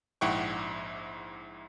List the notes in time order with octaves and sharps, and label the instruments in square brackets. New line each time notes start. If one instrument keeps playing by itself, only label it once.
[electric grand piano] A#1 G#2 E4 F#5 G5 C#6